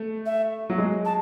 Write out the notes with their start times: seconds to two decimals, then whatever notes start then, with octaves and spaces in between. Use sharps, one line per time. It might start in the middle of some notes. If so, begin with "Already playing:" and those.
Already playing: A3
0.25 E5
0.70 F#3
0.78 G#3
1.05 A5